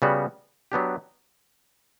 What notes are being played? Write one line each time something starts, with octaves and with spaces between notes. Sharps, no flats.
C#3 G3 B3 F#4
F#3 B3 D4 G4